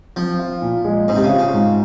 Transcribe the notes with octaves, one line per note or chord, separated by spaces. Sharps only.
F3 C4
F4
A#2
G#3
G#2 C4
C3
C#3
F4
C#3
G#2